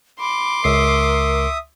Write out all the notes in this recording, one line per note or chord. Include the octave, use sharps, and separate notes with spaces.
B5 C6 D6
C#2 A#4 E5 D#6 C7